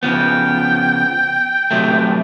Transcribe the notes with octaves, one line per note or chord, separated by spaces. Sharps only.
C#3 F3 B3 G5
C3 F#3 A3